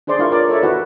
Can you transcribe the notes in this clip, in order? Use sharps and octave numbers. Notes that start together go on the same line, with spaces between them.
D4 G#4 C5 D5 C6
E4 F4 A#4 F5 C#6
F4 A#4 B4 C#5 D5
A4 C#5 D5 E5
E4 F#4 B4